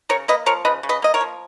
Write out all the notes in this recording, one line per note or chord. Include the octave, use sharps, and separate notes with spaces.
C#3 A#4 C#5
A#3 B4 D#5
F3 A#4 C#5
C#3 B4 D#5
C#3
B4 D#5
A#3 D#5
A#4 C#5
F3